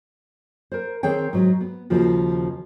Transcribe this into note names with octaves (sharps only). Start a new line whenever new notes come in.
A#4 C5
D#3 C4 G#4 C#5 G5
G#2 F#3
B3
D#2 C#3 F3 F#4